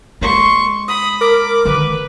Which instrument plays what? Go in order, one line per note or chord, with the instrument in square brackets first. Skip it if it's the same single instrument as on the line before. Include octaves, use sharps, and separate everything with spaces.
[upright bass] G#3 [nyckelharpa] C6 C#6
[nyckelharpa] B5 [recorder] D#6
[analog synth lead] A#4 [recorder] D6
[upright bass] D3 D#3 [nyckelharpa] B4